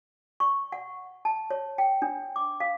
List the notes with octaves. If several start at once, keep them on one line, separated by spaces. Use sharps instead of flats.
C#6
F#5
A5
C#5
G5
D4
D6
F5